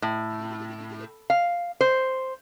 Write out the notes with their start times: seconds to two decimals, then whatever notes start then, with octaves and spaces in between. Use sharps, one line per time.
0.02 A2
1.30 F5
1.81 C5